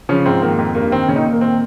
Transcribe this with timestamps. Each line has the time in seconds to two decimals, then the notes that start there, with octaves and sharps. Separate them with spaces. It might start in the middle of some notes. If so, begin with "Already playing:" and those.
0.09 C#3 F3 C#4
0.26 G#2 C4
0.42 D#3 A#3
0.59 F2
0.75 G2 A#3
0.92 D#3 C4
1.08 A#2 C#3 C#4
1.16 D#3 D#4
1.25 A#2
1.33 A#3
1.41 D#3 C4